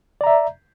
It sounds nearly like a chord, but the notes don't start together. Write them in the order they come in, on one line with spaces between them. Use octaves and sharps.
D5 A#5 E5